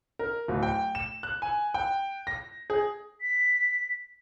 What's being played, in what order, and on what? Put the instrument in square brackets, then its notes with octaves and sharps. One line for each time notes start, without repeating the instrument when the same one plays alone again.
[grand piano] A#4
D1
G5
E7
F#6
G#5
G5
A#6
G#4
[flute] B6